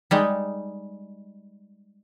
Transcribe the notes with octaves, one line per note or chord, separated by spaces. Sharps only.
G3 G#3 D#4